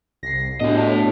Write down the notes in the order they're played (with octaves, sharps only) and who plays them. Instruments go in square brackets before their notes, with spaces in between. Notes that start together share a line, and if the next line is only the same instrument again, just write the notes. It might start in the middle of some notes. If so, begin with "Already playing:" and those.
[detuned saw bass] C2 [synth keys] A#6 C7
[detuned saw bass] A2 [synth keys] B3 D4 F#4 [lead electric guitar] G4 D#5
[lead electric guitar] C#5 A5